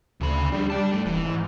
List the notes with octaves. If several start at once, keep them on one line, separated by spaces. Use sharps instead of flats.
D2 C#3 B5
G3 D4 G#4
D5 A5
G2 A3
D#1 E3
G#2